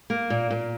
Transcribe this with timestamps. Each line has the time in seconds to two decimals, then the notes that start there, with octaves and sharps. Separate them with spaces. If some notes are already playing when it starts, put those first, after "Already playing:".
0.10 A#3
0.30 A#2
0.51 A#2